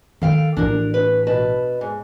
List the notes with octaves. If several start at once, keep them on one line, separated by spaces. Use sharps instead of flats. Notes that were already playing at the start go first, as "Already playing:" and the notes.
D#3 A4 F5 G5
A1 D4 F4 A#4
B4
B2 B4 A5
G#2